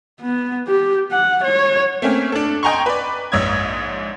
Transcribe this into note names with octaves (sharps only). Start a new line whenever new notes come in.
B3
G4
F#5
C#5
A3 A#3 C4 C#4
D4 A4
D#5 G5 G#5 A#5 C6 C#6
B4 D5
A#1 G#2 C#5 D#6 E6 G#6